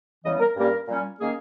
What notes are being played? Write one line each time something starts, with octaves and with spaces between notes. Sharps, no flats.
E2 C#3 E3 G3 B3 D#5
A#4
G2 G3 A#3 C#4 A#4
A#2 G3 C#4
D#3 A#3 C#4 G#4